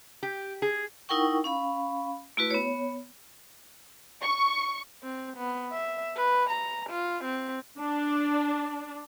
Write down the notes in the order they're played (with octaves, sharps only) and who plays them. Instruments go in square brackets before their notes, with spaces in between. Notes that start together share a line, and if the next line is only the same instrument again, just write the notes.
[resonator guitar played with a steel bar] G4
G#4
[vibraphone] D#4 E4 A#4 F#5 G5 C#6
C#4 F5 B5
A3 E4 F#4 B4
B3 C#5
[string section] C#6
[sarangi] C4
B3
E5
B4
A#5
F4
C4
[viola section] D4